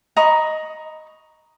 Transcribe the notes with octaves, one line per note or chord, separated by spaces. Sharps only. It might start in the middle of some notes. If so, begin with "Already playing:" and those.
D#5 A#5 B5 C#6